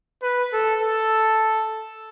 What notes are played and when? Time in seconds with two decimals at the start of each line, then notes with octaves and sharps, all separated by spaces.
0.22 B4
0.53 A4
0.82 A4